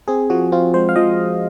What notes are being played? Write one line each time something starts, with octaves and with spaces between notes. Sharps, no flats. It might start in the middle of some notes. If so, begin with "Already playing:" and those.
C4 G#4
F3 F#4
C4 F4
G#3 C5
F5
F3 D#5